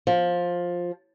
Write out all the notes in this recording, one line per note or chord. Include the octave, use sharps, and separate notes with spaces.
F3